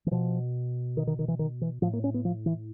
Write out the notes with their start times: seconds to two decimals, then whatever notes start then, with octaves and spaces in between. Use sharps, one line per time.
0.06 E3
0.11 B2 F3
0.97 D#3
1.07 D#3
1.19 D#3
1.28 E3
1.39 D#3
1.61 E3
1.82 A2 F3
1.93 A#3
2.04 C#4
2.14 B3
2.25 F3
2.46 E3